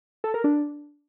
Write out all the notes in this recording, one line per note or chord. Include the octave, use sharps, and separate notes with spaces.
A4
A#4
D4